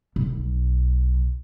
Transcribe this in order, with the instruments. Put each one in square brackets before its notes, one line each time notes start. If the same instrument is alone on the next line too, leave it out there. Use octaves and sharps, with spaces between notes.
[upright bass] B1